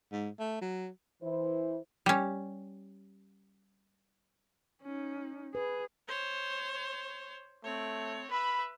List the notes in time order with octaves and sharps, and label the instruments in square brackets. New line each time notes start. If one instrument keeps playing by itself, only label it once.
[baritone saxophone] G#2
A3
F#3
[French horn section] E3 E4 C5
[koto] G3 C#4
[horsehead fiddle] C#4 D#4
[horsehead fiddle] G#4 [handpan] B4
[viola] C5 C#5
[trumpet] A3 [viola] C4 C#5
[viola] B4 E5 [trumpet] B5